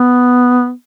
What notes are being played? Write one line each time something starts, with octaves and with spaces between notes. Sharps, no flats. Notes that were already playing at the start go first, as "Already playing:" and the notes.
Already playing: B3